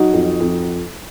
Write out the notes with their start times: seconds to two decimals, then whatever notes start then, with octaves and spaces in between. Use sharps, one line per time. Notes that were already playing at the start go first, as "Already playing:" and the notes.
Already playing: F#3 D#4 F#4
0.13 F2
0.40 F2